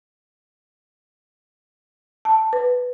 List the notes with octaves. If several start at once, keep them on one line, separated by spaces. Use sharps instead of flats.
A5
B4